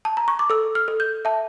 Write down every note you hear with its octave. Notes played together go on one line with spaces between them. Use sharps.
A5
A#5
C#6
D6
A4 E6
F6
A4
G6
E5 A5